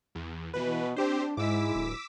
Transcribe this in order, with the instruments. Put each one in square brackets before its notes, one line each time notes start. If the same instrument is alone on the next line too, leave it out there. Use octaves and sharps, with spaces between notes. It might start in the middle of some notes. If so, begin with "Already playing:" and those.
[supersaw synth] E2
[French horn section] B2 [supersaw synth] E3 B4
[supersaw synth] C4 G4 C5 [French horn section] D4
[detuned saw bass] G#2 [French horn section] G#3 E4 [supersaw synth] D6 E6 B6
[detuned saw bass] D1